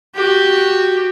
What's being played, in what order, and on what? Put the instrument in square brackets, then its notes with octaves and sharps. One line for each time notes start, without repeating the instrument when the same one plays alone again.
[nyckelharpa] F#4 G4